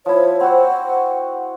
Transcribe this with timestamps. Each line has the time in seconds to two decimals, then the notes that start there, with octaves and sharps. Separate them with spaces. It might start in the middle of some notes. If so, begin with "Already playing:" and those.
0.06 F3 E4 C#5
0.41 C4 F#4 F#5